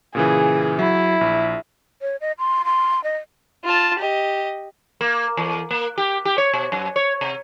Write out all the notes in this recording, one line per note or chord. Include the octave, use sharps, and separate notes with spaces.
A#2 C#3 E3 G#4
F#3 E4
A#1
C#5
D#5
C6
C6
D#5
F4 A5
G4 D#5
A#3
E2
A#3
G4
G4
C#5
B2
F#2
C#5
C3